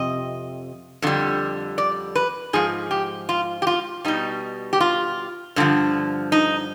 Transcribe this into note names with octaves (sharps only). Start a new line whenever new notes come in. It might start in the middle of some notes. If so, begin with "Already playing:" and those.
Already playing: F2 C3 D#5
F2 D3 G3
D5
B4
G#2 F3 G#4
G4
F4
G4
F4
B2 G3 D#4
G4
F4
G2 D3 F3
D#4